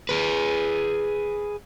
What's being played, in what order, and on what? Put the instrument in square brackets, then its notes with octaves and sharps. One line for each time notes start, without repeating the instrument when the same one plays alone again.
[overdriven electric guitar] G#4 B4